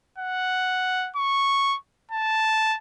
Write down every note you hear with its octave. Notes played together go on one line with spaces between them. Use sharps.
F#5
C#6
A5